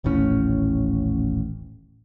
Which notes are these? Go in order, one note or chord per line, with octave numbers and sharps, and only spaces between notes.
D#1 A1 A2 C#4